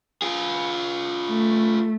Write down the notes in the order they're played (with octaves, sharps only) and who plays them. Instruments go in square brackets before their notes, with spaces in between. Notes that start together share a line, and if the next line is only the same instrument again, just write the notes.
[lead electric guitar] F4 G#4
[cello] A3